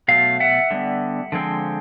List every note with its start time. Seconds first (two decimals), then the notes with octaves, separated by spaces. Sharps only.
0.08 B2 F#3 A3 F5
0.40 E5 F#5
0.71 D3 G3 B3
1.32 D3 F3 G#3 C4